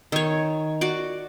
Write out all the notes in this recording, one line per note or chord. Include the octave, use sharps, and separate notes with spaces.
D#3 C#5
F#4 D5